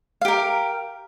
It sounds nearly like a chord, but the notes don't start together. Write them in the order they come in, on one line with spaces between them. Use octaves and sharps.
F5 G4 A#4